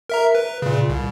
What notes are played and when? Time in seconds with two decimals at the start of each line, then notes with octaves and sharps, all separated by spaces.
0.09 A#4 E5 A#5
0.35 B4
0.62 A#2 C#3
0.89 C2